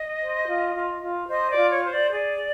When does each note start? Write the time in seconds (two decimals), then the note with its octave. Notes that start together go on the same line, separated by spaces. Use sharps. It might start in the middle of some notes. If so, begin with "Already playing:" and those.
Already playing: D#5
0.19 C5
0.46 F4
0.74 F4
1.02 F4
1.29 C5 D#5
1.50 D5
1.57 F4
1.70 C#5
1.84 C5
1.91 D5
2.11 G#4 D5